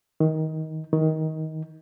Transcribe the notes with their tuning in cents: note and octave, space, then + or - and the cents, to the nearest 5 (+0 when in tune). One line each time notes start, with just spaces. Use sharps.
D#3 +20
D#3 +20